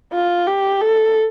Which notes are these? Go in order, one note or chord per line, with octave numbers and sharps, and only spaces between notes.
F4
G4
A4